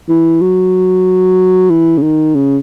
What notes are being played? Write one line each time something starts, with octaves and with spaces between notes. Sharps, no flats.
E3
F#3
E3
C#3
D#3
C#3